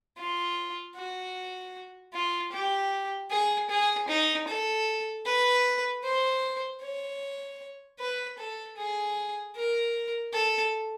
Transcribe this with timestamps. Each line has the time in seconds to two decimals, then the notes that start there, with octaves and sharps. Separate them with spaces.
0.18 F4
0.96 F#4
2.13 F4
2.52 G4
3.30 G#4
3.69 G#4
4.08 D#4
4.48 A4
5.26 B4
6.04 C5
6.82 C#5
7.99 B4
8.39 A4
8.77 G#4
9.55 A#4
10.33 A4